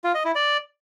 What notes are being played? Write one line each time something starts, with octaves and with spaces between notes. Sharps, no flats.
F4
D#5
E4
D5